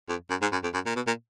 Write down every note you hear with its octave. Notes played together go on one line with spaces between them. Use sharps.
F2
F#2
G#2
F#2
F2
F#2
A#2
B2
A#2